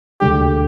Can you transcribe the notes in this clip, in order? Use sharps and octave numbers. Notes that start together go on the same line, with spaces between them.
D2 D3 G#3 D4 G4